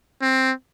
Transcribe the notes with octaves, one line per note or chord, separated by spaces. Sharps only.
C4